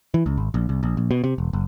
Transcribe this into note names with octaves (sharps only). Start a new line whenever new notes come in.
E3
C#2
G#1
A#1
C2
A#1
A#1
B2
C3
E1
F#1